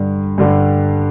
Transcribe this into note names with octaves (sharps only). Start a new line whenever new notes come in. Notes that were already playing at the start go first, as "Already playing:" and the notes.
Already playing: G2 D3 G3
G2 D3 G3